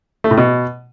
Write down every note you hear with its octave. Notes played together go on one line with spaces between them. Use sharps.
A3
A2
B2